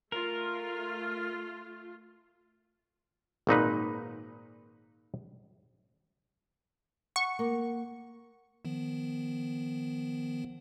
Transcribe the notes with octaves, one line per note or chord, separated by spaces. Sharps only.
A3 F4 A#4
G#1 A#2 D#4 B4
F#5 C#6
A#3
D#3 F3 B3